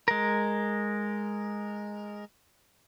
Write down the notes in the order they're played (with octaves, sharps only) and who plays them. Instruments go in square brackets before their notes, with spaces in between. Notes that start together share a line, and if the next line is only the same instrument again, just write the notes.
[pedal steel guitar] G#3 A#4